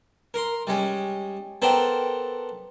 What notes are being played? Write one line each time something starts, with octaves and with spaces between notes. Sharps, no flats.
A#4 C6
G3 G#3 C#4
B3 D4 A4 A#4 C5 G5